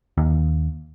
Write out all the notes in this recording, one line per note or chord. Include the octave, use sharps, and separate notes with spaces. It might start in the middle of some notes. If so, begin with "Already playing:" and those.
D#2